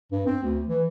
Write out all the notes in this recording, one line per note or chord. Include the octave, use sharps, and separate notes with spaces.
G2
C4
D2
E3